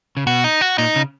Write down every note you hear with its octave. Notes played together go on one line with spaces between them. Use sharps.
C#3
B2 F#4
D#4
F#4
A#2 D#4
C#3